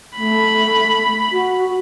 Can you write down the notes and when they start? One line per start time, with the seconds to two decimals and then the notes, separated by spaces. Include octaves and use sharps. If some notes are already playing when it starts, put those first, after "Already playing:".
0.17 A3 B5
1.32 F#4